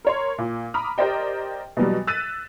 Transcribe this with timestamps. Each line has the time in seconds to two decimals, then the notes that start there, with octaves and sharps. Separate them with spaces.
0.05 A#4 C#5 C6
0.38 A#2
0.74 A#5 B5 D6 D#6 F6
0.98 G4 A#4 C5 D5 D#5 G5
1.77 B2 E3 F#3 G3
2.07 E6 F#6 A6 B6 D#7